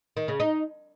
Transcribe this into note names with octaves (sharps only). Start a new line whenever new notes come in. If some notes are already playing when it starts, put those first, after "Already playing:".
D#3
C#3
D#4